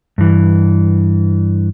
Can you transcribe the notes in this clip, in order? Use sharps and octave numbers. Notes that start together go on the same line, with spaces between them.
G2 E3